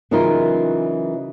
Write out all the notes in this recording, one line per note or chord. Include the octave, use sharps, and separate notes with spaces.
C#3 E3 F#3 D#4 F4 A#4